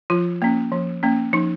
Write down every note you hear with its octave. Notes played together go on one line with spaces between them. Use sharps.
F3 F4
A#3 C#4
F3
A#3 C#4
F3 D#4